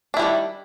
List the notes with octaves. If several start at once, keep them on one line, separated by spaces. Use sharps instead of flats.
D#3 G3 D4 E4